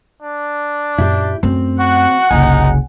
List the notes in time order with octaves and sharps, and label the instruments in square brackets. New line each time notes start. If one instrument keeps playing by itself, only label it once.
[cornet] D4
[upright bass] F#2 A#2 [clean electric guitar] E4 G4
[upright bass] F#2 A3 [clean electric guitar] C4
[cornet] F#4 [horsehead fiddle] F#5
[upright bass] F#1 C2 [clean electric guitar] C#3 G#5 [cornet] D#4